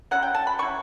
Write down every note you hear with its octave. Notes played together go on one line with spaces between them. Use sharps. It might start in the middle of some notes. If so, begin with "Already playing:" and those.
F#3 C#4 E4 F#5
G5
A5
B5
F#3 C#4 E4 C#6